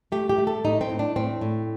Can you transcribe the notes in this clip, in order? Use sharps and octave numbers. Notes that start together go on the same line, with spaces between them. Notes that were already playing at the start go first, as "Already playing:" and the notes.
A3 G4
G4
A3
A4
A2 D#4
C4
A2
D4
A2 C4
A2